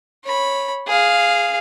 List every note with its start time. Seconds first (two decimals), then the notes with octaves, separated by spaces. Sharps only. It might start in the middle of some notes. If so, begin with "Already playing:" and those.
0.25 C#5 B5
0.87 G#4 F5